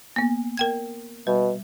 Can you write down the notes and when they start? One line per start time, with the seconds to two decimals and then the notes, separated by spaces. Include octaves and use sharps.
0.16 A#3 B3
0.57 A#4 G5 G#6
1.27 B2 G3